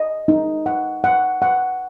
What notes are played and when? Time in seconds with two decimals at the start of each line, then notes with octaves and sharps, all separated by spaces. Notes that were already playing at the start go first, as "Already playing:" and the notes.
Already playing: D#5
0.28 D#4
0.66 F#5
1.04 F#5
1.42 F#5